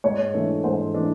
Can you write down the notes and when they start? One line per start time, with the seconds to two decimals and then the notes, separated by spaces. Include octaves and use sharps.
0.04 G#2 C#5
0.34 E3 A3 D4
0.64 G#2 C5
0.94 E3 A3 D4